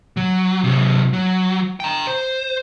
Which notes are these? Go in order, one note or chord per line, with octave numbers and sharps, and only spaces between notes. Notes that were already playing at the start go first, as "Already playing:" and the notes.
F#3
C3 F#3
F#3
G5 A#5
C5